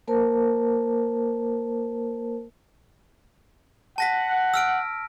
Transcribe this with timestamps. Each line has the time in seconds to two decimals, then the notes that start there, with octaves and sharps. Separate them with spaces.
0.08 A#3 A#4 C5 A5
3.98 F#5 A5 A#6 B6
4.54 E6 F6 D7